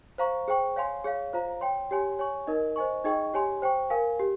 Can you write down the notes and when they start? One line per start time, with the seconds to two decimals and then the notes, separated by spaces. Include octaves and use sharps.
0.18 C5 F5 A#5 C#6
0.48 G#4 C5 G5 C#6
0.76 C#5 F5 G#5 C6
1.04 G#4 C#5 F5
1.33 F4 C5 F5 A#5
1.61 C#5 G5 C6
1.91 G4 C#5 G#5 C6
2.19 C#5 G#5 C#6
2.47 D#4 A#4 D#5
2.76 C5 D#5 G#5 C#6
3.04 D#4 G#4 D#5 G5 C#6
3.34 G4 C#5 G#5 C6
3.62 C5 G5 C#6
3.90 A#4 F5 G#5
4.19 G4